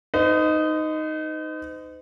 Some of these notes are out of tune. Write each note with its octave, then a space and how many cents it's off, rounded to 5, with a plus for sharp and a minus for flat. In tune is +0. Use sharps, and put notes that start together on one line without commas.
D#4 +0 C5 -45